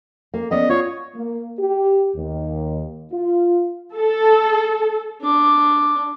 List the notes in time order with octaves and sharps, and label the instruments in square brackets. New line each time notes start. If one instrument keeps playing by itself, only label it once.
[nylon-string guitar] A#3
[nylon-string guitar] B3 C#4 D5 [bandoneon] D#5
[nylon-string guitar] F4 [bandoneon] C#5
[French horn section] A#3
G4
D#2
F4
[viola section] A4
[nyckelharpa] D4 D6